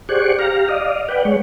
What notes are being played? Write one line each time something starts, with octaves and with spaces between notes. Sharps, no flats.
G4 G#4 C5 D5 F#5 C#6
G4 F5 A#5
D5 D#5 F5
B4 D5 F#5 G5
G#3 C#5